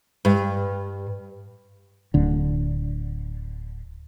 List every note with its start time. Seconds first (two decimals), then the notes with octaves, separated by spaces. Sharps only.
0.25 G2
2.14 D1 D3